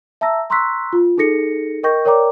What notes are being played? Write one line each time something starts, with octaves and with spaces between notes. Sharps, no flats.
E5 A5 A#5 E6 A#6
A#5 C6 C#6 E6 F#6 B6
F4
D#4 G#4 A4 A#6 C#7
A#4 D#5 G5 C#6 G6 A#6
A#4 C#5 D5 G5 A#5 D6